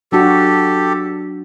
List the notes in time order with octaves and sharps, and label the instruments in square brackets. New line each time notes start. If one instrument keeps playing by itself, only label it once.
[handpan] F#3 D4 F#4 [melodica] G4 A4